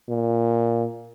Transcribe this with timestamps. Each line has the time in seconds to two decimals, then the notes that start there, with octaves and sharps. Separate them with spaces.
0.09 A#2